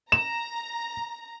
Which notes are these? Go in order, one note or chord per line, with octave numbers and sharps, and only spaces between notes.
A#5 E7